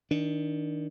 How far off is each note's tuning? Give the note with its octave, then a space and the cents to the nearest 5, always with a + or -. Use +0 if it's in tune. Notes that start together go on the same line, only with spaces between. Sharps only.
D#3 +20 D4 +0